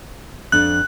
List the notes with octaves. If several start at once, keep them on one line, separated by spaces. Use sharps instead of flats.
F2 D4 F#6